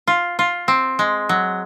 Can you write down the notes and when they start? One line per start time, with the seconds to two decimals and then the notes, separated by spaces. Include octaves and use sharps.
0.08 F4
0.39 F4
0.68 C4
0.99 G#3
1.29 F#3